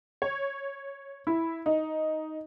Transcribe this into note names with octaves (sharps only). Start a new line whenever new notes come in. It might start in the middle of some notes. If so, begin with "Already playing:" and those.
C#5
E4
D#4